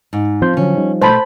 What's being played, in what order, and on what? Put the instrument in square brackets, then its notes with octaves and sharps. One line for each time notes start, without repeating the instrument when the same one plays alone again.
[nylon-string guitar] G#2
[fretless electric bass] F3 [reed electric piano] C4 C6 G6
[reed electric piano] D3 F#3 [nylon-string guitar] C#4
[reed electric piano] G3 D#4
[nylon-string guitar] B2 A3 [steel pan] C5 A5 B5